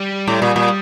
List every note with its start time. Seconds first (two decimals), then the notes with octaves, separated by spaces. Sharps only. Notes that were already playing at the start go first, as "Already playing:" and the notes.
Already playing: G3
0.27 A2
0.42 A#2
0.56 A#2